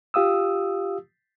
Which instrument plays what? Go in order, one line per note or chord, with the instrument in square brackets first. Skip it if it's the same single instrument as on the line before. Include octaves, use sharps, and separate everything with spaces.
[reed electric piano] F4 G4 F5 D#6 E6